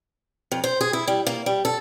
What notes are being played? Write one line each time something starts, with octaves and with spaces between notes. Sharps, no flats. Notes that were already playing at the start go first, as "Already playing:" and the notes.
F2
C5
G#4
E4
G3
A#3
G3
A4